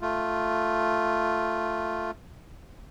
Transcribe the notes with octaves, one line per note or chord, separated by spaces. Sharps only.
A3 F4